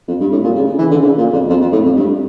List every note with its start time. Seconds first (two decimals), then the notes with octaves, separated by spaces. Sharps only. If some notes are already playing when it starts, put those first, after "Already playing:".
0.08 F2
0.20 G2
0.32 A2
0.43 A#2
0.56 C#3
0.67 C#3
0.79 E3
0.90 D3
1.02 C#3
1.18 A#2
1.33 F2
1.49 F2
1.61 F2
1.73 A2
1.85 F2
1.96 G2